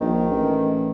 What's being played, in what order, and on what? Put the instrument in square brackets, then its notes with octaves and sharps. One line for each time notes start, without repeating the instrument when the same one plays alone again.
[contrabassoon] A#1 [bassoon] D#3
[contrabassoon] A1